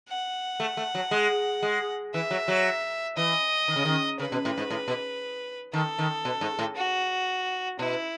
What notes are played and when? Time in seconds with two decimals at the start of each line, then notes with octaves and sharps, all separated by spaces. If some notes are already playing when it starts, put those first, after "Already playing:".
0.08 F#5
0.60 A3
0.77 A3
0.95 F#3
1.11 G#3
1.63 G#3
2.14 E3 E5
2.31 F#3
2.48 F#3
3.16 E3 D#5
3.68 D#3
3.76 C#3
3.85 D#3
4.19 C#3 B4
4.32 B2
4.45 A2
4.58 G#2
4.70 A2
4.88 B2
5.73 D#3 A4
5.99 D#3
6.25 B2
6.41 G#2
6.59 A2
6.75 F#4
7.79 B2 E4